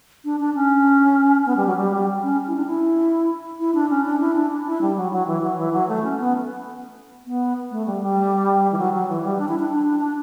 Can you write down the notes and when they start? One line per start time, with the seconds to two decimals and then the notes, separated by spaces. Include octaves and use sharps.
0.25 D4
0.40 D4
0.55 C#4
1.46 B3
1.57 G3
1.67 F#3
1.77 G3
1.92 G3
2.23 C#4
2.48 E4
2.56 D4
2.66 E4
3.60 E4
3.75 D4
3.90 C#4
4.05 D4
4.20 E4
4.36 D4
4.51 D4
4.67 E4
4.82 G3
4.97 F#3
5.12 F#3
5.27 E3
5.43 F#3
5.58 E3
5.73 F#3
5.88 A3
6.04 C#4
6.19 B3
7.26 B3
7.71 A3
7.87 G3
8.02 G3
8.72 E3
8.78 F#3
8.93 F#3
9.09 E3
9.24 G3
9.39 D4
9.49 E4
9.59 D4
9.69 D4
10.00 D4